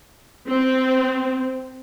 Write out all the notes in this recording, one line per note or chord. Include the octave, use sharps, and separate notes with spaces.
C4